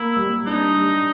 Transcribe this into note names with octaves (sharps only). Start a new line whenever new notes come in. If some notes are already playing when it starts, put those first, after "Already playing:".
Already playing: A#3 E4
G3
D4 D#4
G3